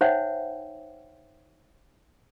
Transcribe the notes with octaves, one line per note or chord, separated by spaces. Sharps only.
D#4 C5 C#5 E5 F#5 G5